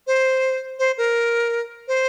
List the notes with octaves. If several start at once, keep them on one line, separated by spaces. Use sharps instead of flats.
C5
C5
A#4
C5